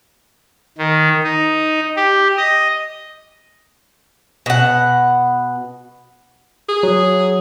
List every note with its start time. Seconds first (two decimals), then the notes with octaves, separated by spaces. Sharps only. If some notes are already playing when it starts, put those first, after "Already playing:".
0.78 D#3
1.23 D#4
1.96 G4
2.37 D#5
4.46 B2 F#5
6.69 G#4
6.83 F#3